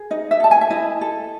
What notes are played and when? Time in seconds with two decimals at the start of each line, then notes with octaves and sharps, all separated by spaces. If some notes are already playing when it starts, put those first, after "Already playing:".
Already playing: G#4
0.11 D#4 D#5
0.31 E5
0.40 A4 A5
0.51 G#5
0.61 E5
0.70 E4 D#5
1.01 A4